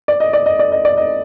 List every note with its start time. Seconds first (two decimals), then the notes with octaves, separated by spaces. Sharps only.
0.08 D5
0.20 D#5
0.33 D5
0.46 D#5
0.59 D5
0.72 D#5
0.85 D5
0.97 D#5